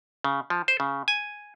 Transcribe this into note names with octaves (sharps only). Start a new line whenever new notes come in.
C#3
F3
C5
C#3
G#5